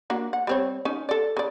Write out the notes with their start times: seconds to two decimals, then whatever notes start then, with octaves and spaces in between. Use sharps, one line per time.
0.10 A#3 D4 F#4
0.33 F#5
0.47 G3 C4 C#5
0.85 C#4 D#4
1.09 A4 D5
1.37 C#3 D5